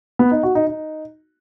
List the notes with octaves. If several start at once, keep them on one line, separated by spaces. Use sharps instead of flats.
B3
D#4
F#4
D#4
D#4